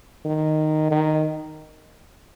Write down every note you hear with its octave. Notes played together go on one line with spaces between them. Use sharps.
D#3
D#3